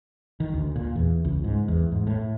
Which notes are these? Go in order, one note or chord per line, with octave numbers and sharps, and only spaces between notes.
D#3
D2
A#2
E2
C#2
G#2
E2
G#2
A2